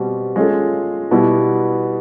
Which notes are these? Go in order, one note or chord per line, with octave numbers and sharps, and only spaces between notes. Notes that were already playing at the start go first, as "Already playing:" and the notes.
Already playing: B2 G3 C4
G#3 C#4 F4 A4
B2 G3 B3 E4